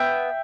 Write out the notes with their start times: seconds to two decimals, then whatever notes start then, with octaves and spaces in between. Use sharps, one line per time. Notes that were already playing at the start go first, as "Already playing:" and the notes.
Already playing: B3 E5 G5